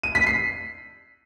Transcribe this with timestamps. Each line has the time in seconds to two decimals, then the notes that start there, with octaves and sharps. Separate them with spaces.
0.03 D#7
0.15 B6
0.27 C7